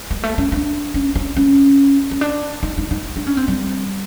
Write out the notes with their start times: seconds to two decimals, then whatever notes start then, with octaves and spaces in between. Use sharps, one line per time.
0.11 G#3
0.24 A3
0.38 C#4
0.52 D4
0.94 C#4
1.15 C#4
1.36 C#4
2.11 C#4
2.21 D4
2.63 D#4
2.78 D#4
2.91 D#4
3.16 D4
3.27 C#4
3.37 C4
3.48 G3